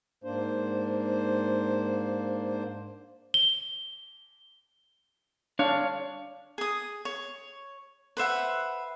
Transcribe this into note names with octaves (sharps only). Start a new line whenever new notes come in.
G#2 A#3 D4 C5
G7
D4 C#5 F5
G#4 D#6
C#5
B4 C5 E5 F#5